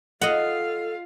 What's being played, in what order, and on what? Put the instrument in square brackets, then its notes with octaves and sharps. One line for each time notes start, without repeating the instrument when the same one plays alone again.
[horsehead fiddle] F4 F5 [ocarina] A4 [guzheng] D#5 F#5